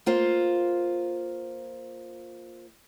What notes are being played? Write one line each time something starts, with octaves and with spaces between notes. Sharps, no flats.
A#3 F4 C5